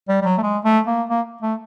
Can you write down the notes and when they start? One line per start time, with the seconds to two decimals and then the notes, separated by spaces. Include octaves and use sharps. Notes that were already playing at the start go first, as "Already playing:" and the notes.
0.08 G3
0.21 G3
0.25 F#3
0.38 A3
0.43 G#3
0.64 A3
0.87 A#3
1.09 A#3
1.42 A3